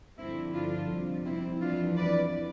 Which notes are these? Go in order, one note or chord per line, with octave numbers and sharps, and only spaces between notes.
G2 D3 F3 C4 E4
D4 F4
F2 C3 G3
C4 E4
F2 E3 G3 D4 F4
B4 D5